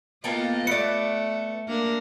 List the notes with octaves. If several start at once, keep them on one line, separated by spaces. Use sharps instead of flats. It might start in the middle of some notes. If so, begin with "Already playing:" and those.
A#3 B3 F4 A4 D#5 G5
A3 B3 D5 C#7
A#3 D4 A#4